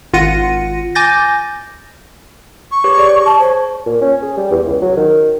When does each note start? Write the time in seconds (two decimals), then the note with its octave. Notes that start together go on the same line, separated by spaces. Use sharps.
0.13 G#1 F4 F#5 A#6 C#7 D#7
0.95 G#5 D6 G6 A6 A#6
2.71 C#6
2.84 G4 B4 C#5
2.98 G#4 D5
3.25 A5
3.40 C5 C#5
3.86 A#2
4.01 C#4
4.22 G#4
4.37 G3
4.51 E2
4.67 C#2
4.82 F#3
4.97 D#3